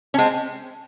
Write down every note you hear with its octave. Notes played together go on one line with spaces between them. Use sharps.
C#4
G#3 C4